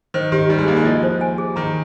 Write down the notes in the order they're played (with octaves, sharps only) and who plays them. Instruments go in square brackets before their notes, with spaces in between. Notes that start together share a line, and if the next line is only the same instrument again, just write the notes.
[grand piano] D#3 [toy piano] C5
[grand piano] D#3 [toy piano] G4
[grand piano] G3 [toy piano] D#4
[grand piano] G#3
[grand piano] A#3 [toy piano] D#4
[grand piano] G#3
[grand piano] F3 [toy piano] D#5
[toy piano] C5
G#5
G#4
[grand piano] D#3 [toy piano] A#5